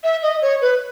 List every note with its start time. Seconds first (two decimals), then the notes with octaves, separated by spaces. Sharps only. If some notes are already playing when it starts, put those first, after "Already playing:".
0.04 E5
0.22 D#5
0.42 C#5
0.61 B4